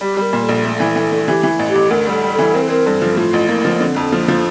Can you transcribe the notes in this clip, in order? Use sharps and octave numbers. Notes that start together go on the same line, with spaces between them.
G3 G4
G3 A#4
A#2
A4
A#1
A3
E3
E3
A3
E3 G4
E3
A1
G4
A1
D2 A#4
G3 A4
G3
E3 A4
C4 A#4
A4
C4 A#4
G2 A4
F3
A2 F4
A1
A#3 E4
F3
A#3
D3 C4
F2
F3 A#3
F3